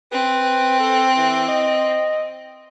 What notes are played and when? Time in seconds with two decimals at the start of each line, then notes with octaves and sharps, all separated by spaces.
0.12 C4 B4
0.79 A4
1.17 E3
1.48 D#5